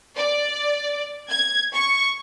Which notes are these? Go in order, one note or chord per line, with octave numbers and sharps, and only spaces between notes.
D5
G#6
C#6